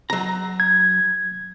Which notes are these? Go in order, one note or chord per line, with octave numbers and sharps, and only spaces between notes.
F#3 A#5
G#6